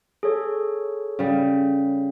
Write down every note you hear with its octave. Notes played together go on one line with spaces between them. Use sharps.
G#4 A4 C#5
C#3 G3